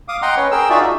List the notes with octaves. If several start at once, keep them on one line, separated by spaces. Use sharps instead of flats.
F5 D6 D#6
D#5 F#5 G5 A#5 C6
C#4 B4 C#5
G#4 A#4 G5 E6
D#4 F4 F#4 G#4 D5 E5
D4